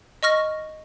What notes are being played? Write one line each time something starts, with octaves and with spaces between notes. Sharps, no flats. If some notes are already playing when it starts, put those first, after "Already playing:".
D#5 C#6 F6 A#6